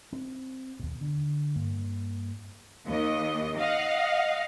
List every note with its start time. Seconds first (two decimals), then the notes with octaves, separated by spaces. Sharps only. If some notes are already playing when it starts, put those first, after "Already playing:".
0.13 C4
0.80 D#2 B2
1.01 D3
1.56 G2 A#3
2.87 D#2 D#5
3.57 D#5 F5 F#5